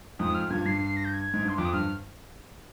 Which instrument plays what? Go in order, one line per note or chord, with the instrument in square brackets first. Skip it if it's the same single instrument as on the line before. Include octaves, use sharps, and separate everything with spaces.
[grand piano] F2 G#2 [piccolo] D#6
[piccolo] F6
[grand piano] G2 A#2 [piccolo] G#6
[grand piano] G2 [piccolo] C7
[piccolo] C7
A#6
G6
G#6
[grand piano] G#2
G2
[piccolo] C6
[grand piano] F2 [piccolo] D6
[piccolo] D#6
[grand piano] G2 [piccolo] F6